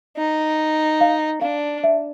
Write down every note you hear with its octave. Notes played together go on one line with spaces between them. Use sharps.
D#4
F5
D4 F5
E5